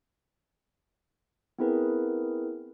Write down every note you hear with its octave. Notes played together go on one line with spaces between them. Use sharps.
B3 C4 E4 G#4 A#4 B4